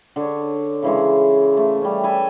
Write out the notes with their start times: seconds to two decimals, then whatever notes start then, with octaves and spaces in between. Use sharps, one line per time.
0.16 D3 C#5
0.82 C#3 E3 G#3
1.57 A3
1.81 G3 C#4
2.03 A4 G#5 B5